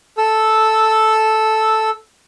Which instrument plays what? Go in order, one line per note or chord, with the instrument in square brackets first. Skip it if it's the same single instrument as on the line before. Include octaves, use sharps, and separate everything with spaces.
[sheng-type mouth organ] A4 E6